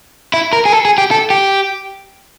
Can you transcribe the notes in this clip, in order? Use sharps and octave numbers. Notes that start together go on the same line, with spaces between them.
E4
A#4
G#4
A4
G#4
G4
A4
G4